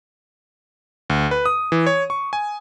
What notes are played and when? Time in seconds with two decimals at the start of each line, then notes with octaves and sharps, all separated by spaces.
1.10 D2
1.31 B4
1.46 D#6
1.72 E3
1.86 C#5
2.10 C#6
2.33 G#5